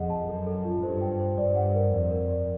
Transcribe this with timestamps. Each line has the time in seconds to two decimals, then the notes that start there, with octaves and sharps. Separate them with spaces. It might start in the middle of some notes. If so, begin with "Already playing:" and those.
Already playing: F2 G#4 D#5 F#5
0.10 A5
0.28 F#2 A4
0.47 A4
0.64 F4
0.83 G2 C5
1.01 G5
1.19 C5
1.38 G2 D5
1.55 F#5
1.74 A#4
1.92 F2 D5
2.11 A#4
2.29 D5